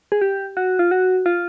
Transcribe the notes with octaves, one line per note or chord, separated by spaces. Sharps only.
G#4
G4
F#4
F4
F#4
F4